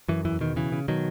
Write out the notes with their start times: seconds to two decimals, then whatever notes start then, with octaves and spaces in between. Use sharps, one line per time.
0.08 F#2 E3
0.25 E2 E3
0.40 B2 D#3
0.56 C#3 E3
0.72 C#3
0.88 B2 D#3 F#3